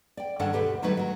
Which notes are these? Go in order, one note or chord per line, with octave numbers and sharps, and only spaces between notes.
D5 G5
G2 D#3 C#4 D4 A4 F#5
D2 B2 G4 B4
D#3 F#3 G3 A3 D#4 B4
F#3 A#4